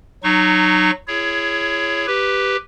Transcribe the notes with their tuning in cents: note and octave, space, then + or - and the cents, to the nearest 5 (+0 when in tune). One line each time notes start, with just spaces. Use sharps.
F#3 +0 D#4 -30 C#6 +0
E4 +35 G#4 +0 C#5 +10
G4 +0 B4 +0